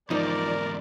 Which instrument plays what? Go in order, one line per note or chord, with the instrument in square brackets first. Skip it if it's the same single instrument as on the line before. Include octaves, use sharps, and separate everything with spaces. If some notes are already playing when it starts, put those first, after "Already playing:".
[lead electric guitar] E2 G#2 [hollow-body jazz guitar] F3 D#4 [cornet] A#4 [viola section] D5